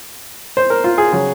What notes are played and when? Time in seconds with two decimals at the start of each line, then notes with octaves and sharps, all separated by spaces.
0.57 C5
0.70 A#4
0.84 F4
0.98 G#4
1.13 C#3 F#3